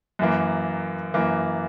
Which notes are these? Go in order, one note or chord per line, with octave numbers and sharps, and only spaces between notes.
F#2 E3 A#3
F#2 E3 A#3